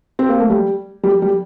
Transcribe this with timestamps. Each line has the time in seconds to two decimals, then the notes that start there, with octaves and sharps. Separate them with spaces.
0.19 C4
0.29 A#3
0.40 A3
0.50 G3
1.04 G3
1.22 G3